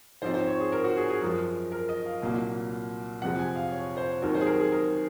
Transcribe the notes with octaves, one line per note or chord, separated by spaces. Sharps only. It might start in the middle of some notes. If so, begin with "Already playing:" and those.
G#2 F3 C4 C5
C5
C#5
G#4
A#4
F#4
G#4
G#4
F#2 F3 G#3 A#4
A#4
D#5
F5
C2 A#2 F#3 A#3
F2 C3 F3 G#3 C4 F#5
G#5
F5
C#5
C5
D#2 D#3 F#3 C4 A#4
C5
G#4
A#4
G#4
A#4